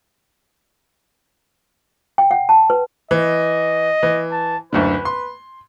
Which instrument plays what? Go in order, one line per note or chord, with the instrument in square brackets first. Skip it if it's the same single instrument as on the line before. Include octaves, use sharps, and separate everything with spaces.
[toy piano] G5
F#5
A5
B4
[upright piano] E3 [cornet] D#5
[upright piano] E3
[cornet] A5
[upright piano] F#1 D2 D3 [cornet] B4
[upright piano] C6